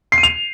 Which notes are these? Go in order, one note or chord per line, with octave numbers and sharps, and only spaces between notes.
C7
D#7
F7